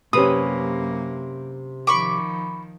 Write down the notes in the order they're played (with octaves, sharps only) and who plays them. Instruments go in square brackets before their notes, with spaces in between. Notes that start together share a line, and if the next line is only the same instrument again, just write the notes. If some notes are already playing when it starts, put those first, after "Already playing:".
[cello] F#2 A#3 [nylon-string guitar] C3 C#4 [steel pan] G4 B4 D#6 [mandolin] B5
[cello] D#3 F3 [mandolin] B5 C#6 D6